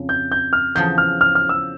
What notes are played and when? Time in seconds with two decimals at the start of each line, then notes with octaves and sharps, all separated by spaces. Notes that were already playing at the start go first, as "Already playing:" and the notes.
Already playing: F2 C#3
0.09 G6
0.32 G6
0.53 F6
0.75 E2 C#3 F3 G6
0.98 F6
1.21 F6
1.35 F6
1.49 E6